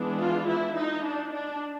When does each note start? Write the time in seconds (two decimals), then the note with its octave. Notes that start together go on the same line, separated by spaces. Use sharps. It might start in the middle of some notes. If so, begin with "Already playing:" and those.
Already playing: E3 G#3 B3 D4
0.19 F4
0.48 E4
0.77 D#4
1.05 D4
1.34 D4